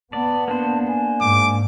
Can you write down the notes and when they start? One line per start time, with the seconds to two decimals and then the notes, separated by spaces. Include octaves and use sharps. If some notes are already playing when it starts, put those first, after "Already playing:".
0.13 B3 D5 A5
0.48 A#3 D4 C5 A5
0.88 G#5
1.21 G#2 D6